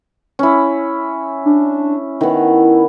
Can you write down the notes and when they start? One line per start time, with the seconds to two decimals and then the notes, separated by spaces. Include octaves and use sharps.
0.39 C#4 E4
1.46 D4
2.21 D#3 B3 E4